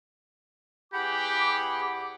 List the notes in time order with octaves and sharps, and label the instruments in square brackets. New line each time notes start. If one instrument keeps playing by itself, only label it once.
[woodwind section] E2 E4 D6 [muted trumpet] G4 [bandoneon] G#4 F#5 [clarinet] B5